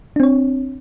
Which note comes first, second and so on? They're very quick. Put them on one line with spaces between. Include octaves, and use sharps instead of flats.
D4 C4 C#5